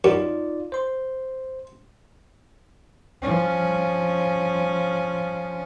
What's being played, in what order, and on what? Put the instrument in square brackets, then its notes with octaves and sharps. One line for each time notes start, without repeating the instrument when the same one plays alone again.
[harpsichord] F#2 [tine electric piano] D#4 F4 D5
[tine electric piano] C5 C6
[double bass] F3 C#4